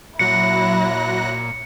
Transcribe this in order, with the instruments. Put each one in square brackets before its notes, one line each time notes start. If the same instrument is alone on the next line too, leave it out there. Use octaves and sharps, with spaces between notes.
[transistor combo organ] A#2 [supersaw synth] F#3 F#6 A#6 [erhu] E4 [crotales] C#7